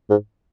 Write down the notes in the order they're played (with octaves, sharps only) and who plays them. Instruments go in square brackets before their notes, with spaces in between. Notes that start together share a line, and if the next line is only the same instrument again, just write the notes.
[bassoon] G#2